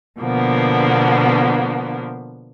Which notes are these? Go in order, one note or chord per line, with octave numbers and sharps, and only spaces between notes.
B2 D3 F3 A#3 B3